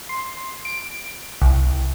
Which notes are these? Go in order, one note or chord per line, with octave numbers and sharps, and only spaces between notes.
C6
D7
C2